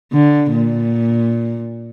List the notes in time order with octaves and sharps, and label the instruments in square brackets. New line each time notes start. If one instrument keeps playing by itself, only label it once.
[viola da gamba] D3
A#2